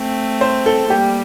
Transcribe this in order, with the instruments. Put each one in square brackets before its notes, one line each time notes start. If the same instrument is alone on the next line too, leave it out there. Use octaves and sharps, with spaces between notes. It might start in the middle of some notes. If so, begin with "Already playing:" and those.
Already playing: [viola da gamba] A3 C4
[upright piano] C5
A4
[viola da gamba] G3 A#3 [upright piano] G4